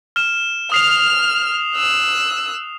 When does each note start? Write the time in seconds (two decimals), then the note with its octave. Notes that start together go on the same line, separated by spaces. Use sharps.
0.16 F6 E7
0.72 D#6 F6 C7 F7
1.76 E6 F#6